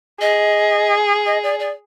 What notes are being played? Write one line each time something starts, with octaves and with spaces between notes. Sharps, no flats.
G#4 D#5
D#5
D5
D5